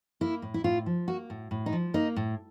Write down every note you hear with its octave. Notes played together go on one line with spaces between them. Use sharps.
A#3 E4
A2
E4
A2 F4
F3
A#3 F#4
A2
A2
D#4
F3
A#3 D#4
A2